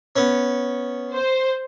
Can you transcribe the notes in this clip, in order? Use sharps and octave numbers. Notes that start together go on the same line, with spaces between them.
B3 C#4
C5